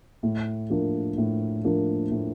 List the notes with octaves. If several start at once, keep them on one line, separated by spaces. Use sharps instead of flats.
A2
F3 A#3 D4
A2
F3 A#3 D4
A2